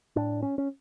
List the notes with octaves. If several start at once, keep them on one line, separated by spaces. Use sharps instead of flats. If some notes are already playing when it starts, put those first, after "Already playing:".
A2 D4
C#4
C#4